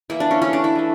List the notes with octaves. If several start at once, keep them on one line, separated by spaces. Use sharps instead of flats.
E3 A#3 E4
D4
C#4
E3 A3 C#4
D4
E4
E3 A3